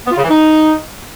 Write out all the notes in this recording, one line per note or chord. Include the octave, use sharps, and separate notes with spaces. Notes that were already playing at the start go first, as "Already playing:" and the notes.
B3
F4
C#3
E3
D#4